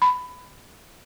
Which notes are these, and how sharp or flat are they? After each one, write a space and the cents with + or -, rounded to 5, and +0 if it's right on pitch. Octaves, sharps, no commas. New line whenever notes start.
B5 +15